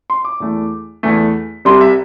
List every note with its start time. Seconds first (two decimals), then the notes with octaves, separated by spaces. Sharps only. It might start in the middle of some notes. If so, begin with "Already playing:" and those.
0.10 C6
0.25 D6
0.40 E2 E3 A3
1.03 E2 E3 A3
1.65 C2 C3 G3 C6
1.81 E5